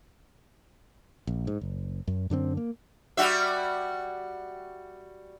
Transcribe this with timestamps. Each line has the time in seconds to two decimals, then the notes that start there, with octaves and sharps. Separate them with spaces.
1.27 A#1
1.47 G#2
1.61 F#1
2.08 F#2
2.30 F#2 D3 G#3 C4
2.57 A#3
3.17 G3 F#4 E5